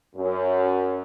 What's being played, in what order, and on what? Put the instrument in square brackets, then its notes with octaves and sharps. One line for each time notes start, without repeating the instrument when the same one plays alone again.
[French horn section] F#2